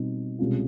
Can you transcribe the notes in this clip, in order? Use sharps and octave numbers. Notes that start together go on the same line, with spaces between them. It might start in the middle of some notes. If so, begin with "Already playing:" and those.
Already playing: B2 G3 C4 D#4
C2 B2 G#3 C#4 F4